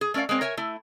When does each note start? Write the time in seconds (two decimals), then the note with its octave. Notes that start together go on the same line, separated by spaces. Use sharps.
0.01 G#4
0.14 A3 C#4 A#4 D5 F5
0.29 G#3 A#3 C4 C#5
0.41 A#4 C#5 E5 G#5
0.57 A3 E4